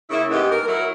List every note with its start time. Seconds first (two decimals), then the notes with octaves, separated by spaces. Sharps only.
0.10 C#3 A#3 E4
0.31 G#2 A#3 B3 D#4 G4
0.50 A#4
0.67 F#3 E4 A#4